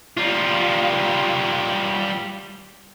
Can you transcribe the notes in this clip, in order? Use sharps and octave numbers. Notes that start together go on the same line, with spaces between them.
G3 F4